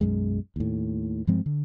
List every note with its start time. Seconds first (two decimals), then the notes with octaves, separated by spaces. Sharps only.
0.01 B1 F#2 G#3
0.56 D#2 A2
1.27 G2 F3 G#3 C4
1.46 D3